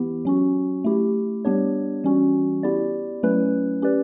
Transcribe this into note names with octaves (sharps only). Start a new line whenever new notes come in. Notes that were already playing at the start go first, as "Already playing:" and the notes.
Already playing: E3 B3 E4 G4
F#3 C#4 F#4
A3 E4 G4
G3 B3 D4 G4 C#5
E3 G3 C#4 F#4
B3 E4 G4 D5
F#3 A3 C#4 E4 B4
C#4 G4 B4 D5